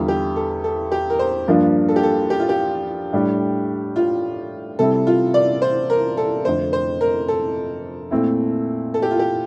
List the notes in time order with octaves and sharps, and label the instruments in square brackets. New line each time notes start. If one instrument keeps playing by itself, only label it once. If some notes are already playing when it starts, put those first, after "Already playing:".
Already playing: [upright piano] E2 D3 G3 [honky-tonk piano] F4
[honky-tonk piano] G4
A4
A4
G4
A#4
C5
[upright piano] G2 F3 A#3 D4
[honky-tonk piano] A4
G4
A4
G4
F4
G4
[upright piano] A2 G3 D4
[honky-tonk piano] F4
[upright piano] C3 G3 C4 E4 [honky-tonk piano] A4
[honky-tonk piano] F4
D5
C5
A#4
A4
[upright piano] F2 D3 A3 [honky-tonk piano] C5
[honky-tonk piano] C5
A#4
A4
[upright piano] A#2 A3 C4 E4
[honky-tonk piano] A4
G4
F4
G4